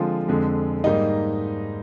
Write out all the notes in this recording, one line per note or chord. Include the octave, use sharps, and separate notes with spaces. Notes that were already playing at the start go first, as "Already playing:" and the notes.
Already playing: D3 F3 G#3 C4 F4
F2 D3 G#3
G#2 G3 A#3 D#4 D#5